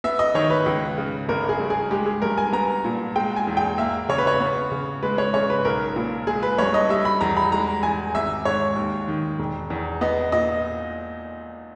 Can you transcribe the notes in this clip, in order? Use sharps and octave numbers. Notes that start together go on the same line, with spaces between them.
B3 E5
D#5
D#3 C#5
B4
C#2
C#3
G1 A#4
G#4
G2
G#4
G#3 G4
G#4
G2 A#4
G#5
B3 A#5
A#2
G#3 G5
G#5
E2
G5
A#3 E5
C#3 C#5
B4
C#5
B3
C#3
G#3 B4
C#5
C#3 C#5
B4
B1 A#4
A#2
G#3 G#4
B4
G2 C#5
D#5
G3 E5
B5
E2 A#5
B5
G#3 A#5
E2 G#5
G#1 E5
G#2 C#5
D#2
D#3
E1
E2
B3 D#5
A#2 D#5